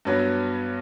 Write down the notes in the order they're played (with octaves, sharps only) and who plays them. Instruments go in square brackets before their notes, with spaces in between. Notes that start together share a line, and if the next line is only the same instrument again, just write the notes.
[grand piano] G2 F#3 B3